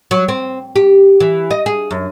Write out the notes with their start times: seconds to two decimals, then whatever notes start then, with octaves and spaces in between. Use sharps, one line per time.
0.11 F#3
0.28 C4
0.76 G4
1.20 E3
1.51 D#5
1.66 G#4
1.91 F#2